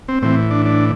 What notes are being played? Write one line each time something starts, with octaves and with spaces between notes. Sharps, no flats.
C4
A2 E3 C4
D4
D4